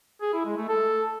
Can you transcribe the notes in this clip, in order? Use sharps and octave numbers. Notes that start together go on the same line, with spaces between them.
G#4
E4
G#3
A3
A4